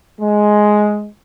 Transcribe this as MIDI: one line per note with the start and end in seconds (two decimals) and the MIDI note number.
0.20 1.07 56